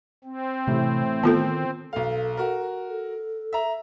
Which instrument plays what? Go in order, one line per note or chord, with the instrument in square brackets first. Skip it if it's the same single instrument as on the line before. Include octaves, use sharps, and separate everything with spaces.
[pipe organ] C4
[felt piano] A2 E3 [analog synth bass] C3
[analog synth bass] D#3 [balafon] B3 F4 A4
[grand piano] B1 F5 [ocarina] A4
[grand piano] F#4 A#4
[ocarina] A4
[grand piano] E5 A#5